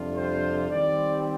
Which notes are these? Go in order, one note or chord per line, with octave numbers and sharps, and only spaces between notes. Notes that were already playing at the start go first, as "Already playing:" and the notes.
Already playing: F2 C3 G3 D4 F4
C5
D#3 G3 C4 D5